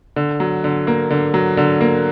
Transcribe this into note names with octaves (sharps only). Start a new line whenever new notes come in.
D3
F#3
D3
A#3
D3
F#3
D3
A#3